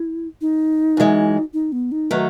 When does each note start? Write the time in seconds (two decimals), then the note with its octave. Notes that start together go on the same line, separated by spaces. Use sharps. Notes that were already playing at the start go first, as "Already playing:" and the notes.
Already playing: E4
0.41 D#4
0.97 F#2 E3 G#3
1.54 D#4
1.72 B3
1.92 D#4
2.11 D#3 F#3 A3 B4